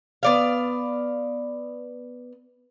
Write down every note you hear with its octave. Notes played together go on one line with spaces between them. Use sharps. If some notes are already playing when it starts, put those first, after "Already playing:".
B3 D5 F5